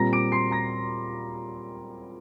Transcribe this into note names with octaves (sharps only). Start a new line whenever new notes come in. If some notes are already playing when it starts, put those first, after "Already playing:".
Already playing: A#2 G3 C4 A#5 A#6
D6 D7
C6 C7
A#5 A#6